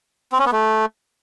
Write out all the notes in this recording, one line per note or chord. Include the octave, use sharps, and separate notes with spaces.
C4
C#4
B3
A3